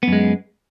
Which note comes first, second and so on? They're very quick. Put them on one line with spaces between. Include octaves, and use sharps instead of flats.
B3 F#2 G#3